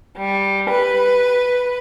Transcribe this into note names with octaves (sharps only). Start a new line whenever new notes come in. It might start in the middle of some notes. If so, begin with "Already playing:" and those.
G3
B4